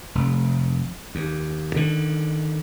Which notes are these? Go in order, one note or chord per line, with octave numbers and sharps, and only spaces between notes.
F1
D#2
D3 D#3